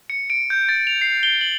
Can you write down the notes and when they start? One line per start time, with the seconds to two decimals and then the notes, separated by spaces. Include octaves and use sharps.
0.10 C#7
0.30 D7
0.50 G6
0.69 A6
0.87 F7
1.01 C7
1.23 G7
1.41 F#7